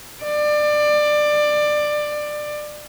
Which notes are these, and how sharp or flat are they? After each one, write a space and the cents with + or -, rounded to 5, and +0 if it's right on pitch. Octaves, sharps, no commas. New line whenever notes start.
D5 +20